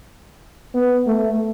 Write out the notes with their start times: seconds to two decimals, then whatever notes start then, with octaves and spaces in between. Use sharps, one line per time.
0.74 B3
1.07 A3